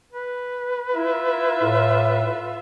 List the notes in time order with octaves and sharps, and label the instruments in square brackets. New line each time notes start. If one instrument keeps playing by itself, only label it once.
[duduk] B4
[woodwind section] E4 [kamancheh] F4 E5
[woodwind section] A2